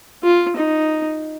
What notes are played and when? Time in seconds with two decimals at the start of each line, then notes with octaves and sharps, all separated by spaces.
0.23 F4
0.57 D#4